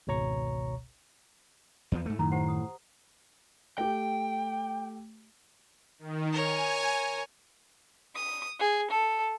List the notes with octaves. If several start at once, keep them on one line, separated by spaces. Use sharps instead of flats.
G#1 C#2 B2 C#5 A#5 C#6
E2 F3
G#2 A3
F#2 A2 D#3 A#5
G4 C5 F#5
D#6
A3 G4 G5
D#3
A#4 C#5 G#5
D#6
G#4
A4